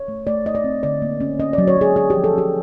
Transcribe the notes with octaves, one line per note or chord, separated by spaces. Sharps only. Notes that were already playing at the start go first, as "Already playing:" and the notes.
Already playing: C#5
A3
A3 D5
A3 D#5
D5
C4
D3 D5
A#3
C#4
C#4 D#5
F#3 D5
C#5
F#3 G#4
D3 G#4
F3 G4
A4
C#4 G4